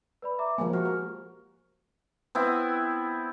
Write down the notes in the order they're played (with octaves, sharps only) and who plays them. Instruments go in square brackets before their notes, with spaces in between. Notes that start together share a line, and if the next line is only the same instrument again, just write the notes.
[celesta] B4 D5 B5
E5 A#5 D6
[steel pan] F3 G#3 A#3 [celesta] G#5
[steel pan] F#4 [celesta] G4 F6
[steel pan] A#4
[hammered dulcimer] B3 C4 E4